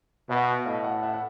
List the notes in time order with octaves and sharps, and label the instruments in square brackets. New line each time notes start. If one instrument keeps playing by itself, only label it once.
[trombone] B2 [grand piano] E5 F#5
[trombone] A2 [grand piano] D#5 F5
[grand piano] E5 F#5
E5 F#5
F#5